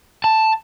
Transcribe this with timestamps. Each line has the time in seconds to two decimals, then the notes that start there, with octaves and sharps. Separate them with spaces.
0.24 A5